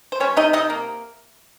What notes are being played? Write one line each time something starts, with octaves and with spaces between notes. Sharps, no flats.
C5
G3 C#4 C#5
C3 D#4 D#5
C3 D#4 D#5
A#3